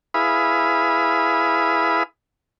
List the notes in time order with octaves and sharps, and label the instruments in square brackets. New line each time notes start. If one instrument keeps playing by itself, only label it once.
[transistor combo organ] E4 G#4 B4 F5 B5 D#6